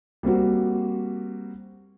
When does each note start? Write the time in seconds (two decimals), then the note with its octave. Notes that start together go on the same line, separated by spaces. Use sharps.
0.23 G3 A#3 C4 F#4